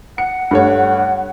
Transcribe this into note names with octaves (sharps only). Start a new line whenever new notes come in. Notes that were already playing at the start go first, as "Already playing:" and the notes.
F#5 C#7
G2 A3 C#5